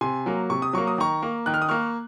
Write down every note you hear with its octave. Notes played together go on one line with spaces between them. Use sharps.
C3 G#5 C6
F#3 A#3
C3 C#6
D#6
F#3 A#3 C#6
D#6
D#3 A#5 C#6
A#3
D#3 F#6
F6
D#6
A#3 C#6 F6